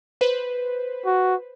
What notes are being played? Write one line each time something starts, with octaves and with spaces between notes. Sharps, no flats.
B4 C5
F#4